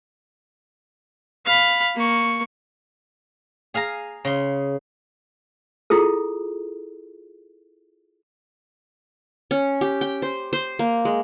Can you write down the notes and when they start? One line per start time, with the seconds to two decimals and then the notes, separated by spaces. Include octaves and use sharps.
1.45 F5 B5
1.95 A#3 C#6
3.74 G#4 F5 G#5 A#5
4.25 C#3 C6
5.90 E4 F4 G#4 A4
9.51 C#4
9.81 G4
10.01 G5
10.22 C5
10.53 C5
10.79 A#3
11.05 G#3